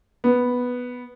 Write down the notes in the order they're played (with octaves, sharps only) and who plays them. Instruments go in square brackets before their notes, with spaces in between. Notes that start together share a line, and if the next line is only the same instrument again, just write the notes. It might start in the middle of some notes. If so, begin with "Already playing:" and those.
[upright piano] B3